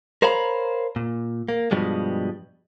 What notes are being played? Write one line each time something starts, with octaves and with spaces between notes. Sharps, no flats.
A#4 C5 C#5 F5 A#5 B5
A#2
A#3
G2 B2 F3 G3 G#3